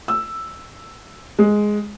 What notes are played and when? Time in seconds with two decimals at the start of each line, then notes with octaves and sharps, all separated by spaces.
0.08 E6
1.39 G#3